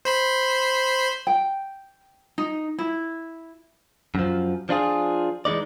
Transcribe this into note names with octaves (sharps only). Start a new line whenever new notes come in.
C5 B5 C6
G5
D#4
E4
F#2 F3
F3 D4 F4 G#4
E3 G#3 D#4 D5